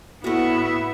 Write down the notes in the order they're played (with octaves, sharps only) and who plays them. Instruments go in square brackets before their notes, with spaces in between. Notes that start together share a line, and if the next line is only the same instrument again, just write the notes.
[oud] A2 F#4 [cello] B3 E5 [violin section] E4